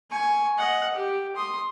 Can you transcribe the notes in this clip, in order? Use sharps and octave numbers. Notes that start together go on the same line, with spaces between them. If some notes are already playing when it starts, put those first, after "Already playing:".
G#5 C#6
D#5 F#5
G4
C6 D#6